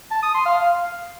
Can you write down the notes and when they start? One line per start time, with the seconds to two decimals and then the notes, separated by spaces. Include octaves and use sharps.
0.11 A5
0.23 D#6
0.34 C6
0.46 F5
0.57 F5